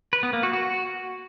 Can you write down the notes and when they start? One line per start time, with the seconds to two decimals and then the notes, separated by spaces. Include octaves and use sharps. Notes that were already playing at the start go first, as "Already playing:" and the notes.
0.13 B4
0.23 B3
0.33 A#3
0.43 F#4
0.53 F#4